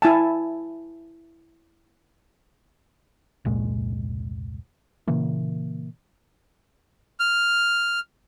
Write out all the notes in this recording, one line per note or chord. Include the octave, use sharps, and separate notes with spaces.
E4 G#5 A5
F1 C#2 A#2 G#3
A#2 C#3 E3 A#3
F6